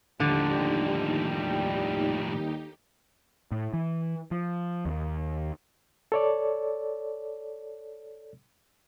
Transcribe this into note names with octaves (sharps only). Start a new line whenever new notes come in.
D#2 A2 D3 F3 G3 D#4 G4
A2
E3
F3
D#2
A4 C#5 D5